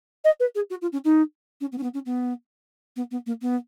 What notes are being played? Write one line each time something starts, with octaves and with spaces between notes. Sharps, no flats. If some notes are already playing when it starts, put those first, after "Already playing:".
D#5
B4
G#4
F#4
F4
C#4
D#4
C#4
B3
C#4
B3
C#4
B3
B3
B3
A#3
B3